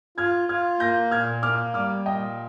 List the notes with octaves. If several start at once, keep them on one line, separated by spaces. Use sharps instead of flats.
F4 F6 G#6
F4 F6 G#6
A#3 G6 A#6
A#2 F6 G#6
A#3 D6 F6
G3 D6 F6
A#2 D#5 G5